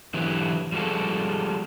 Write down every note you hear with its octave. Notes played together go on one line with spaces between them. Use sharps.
D3 E3 F#3 E4 G4 B4
F3 G3 G#3 F#4 A4